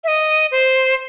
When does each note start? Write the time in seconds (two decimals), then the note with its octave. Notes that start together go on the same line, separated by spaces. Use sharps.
0.04 E5
0.08 D#5
0.51 C5